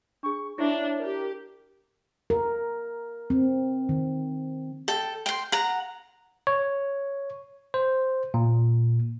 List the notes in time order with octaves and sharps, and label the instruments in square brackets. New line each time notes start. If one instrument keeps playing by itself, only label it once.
[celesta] D4 G#4 [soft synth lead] C#6
[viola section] D4 [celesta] E4 E5 [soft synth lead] C#5
[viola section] G4 [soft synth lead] A#4
[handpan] A#4
C4
D#3
[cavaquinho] A4 G5
G5 C6
F#5 A#5
[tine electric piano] C#5
C5
A#2